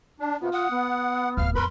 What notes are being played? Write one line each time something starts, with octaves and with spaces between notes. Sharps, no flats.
D4
C3 B3 F4
F#5 D#6
B3
D1 F#2 F5 F6
F2 F#3 A#4 B4 B5 C6